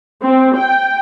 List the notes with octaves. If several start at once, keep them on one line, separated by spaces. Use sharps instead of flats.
C4
G5